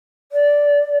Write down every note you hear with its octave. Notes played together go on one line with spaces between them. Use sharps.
D5